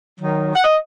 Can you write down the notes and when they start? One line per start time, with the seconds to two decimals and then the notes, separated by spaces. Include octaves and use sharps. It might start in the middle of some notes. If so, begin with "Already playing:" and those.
0.20 D#3 F#3
0.55 F#5
0.64 D#5